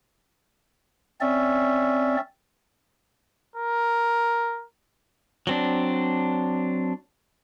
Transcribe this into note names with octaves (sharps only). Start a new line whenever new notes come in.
C4 C#4 D5 E5
A#4
F#3 C4 D4